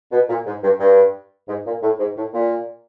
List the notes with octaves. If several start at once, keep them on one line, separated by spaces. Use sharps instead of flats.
B2
A#2
G#2
G2
G2
G#2
A#2
A2
G#2
A2
A#2